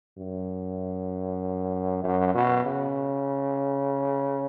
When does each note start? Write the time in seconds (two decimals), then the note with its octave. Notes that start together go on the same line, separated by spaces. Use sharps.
0.17 F#2
2.04 F#2
2.35 B2
2.66 C#3